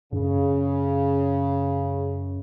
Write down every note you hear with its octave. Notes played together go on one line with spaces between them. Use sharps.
F#2 C#3